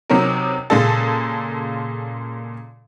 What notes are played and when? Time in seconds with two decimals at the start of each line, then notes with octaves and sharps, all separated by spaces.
0.10 C3 F#3 C4 C#4 D#4 A#4
0.70 A#2 C#3 G#3 A#3 A4